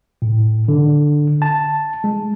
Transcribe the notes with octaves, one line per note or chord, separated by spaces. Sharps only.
A2
D3
A5
G#3